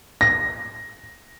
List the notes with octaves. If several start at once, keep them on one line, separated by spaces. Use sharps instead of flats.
A#6